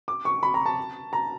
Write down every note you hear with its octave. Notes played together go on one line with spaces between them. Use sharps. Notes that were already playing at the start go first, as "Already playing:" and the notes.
D6
C#6
B5
A#5
A5
A#5